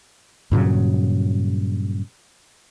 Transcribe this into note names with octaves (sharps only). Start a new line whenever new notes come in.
G2 A#2 C#3 F#3